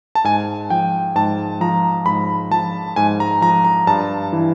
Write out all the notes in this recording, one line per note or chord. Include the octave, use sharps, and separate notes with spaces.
A5
G#2 G#5
F3 G5
G#2 A5
F3 A#5
G#2 B5
F3 A5
G#2 G#5
A#5
F3 A#5
A#5
G2 A5
E3